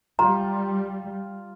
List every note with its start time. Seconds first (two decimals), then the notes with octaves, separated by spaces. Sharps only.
0.19 G3 F4 A#5